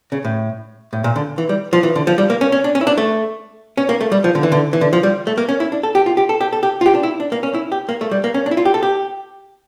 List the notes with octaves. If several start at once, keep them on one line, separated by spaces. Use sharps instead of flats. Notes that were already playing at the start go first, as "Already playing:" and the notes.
C#3
A2
A2
A#2
D3
E3
G3
F3
E3
D3
F3
G3
A#3
C#4
C#4
D4
C#4
E4
D4
A3
C#4
A#3
A3
G3
F3
D3
E3
D3
E3
D3
F3
G3
A3
A#3
C#4
E4
D4
A4
G4
F4
G4
A4
G4
A4
G4
F4
G4
D4
E4
D4
A#3
C#4
E4
G4
A#3
A3
G3
A#3
C#4
D4
E4
F4
G4
A4
G4